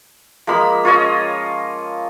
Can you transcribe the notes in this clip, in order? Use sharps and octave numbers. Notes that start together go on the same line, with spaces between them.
F3 G#3 A#3 B5
C#4 F4 C#5 D#5